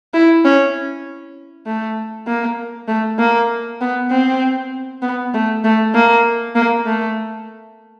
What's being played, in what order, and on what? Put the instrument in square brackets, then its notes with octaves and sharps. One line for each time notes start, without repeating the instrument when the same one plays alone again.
[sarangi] E4
C#4
A3
A#3
A3
A#3
B3
C4
B3
A3
A3
A#3
A#3
A3